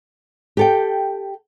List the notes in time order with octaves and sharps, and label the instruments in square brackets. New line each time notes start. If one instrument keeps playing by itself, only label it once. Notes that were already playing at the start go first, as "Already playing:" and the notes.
[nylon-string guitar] G4 A4 G5